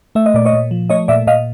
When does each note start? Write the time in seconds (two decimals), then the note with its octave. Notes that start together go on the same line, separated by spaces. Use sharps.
0.15 A3 E5
0.26 D#5
0.34 A#2 D5
0.45 C#5 D#5
0.53 A#2
0.71 F3
0.90 A3 C#5 D#5
1.08 A#2 D5 E5
1.27 A#2 D#5 F5